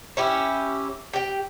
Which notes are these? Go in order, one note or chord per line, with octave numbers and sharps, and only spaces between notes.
C#4 E4 G4
G4 G5